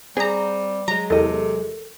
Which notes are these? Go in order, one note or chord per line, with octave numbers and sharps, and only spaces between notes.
G3 C4 G#4 A#5
F#3 G#3 A#5
E2 C3 A4 A#4 D#5